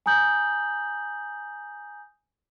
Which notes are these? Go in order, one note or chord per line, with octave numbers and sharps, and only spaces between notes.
G#5 A#5 D#6 G6 F#7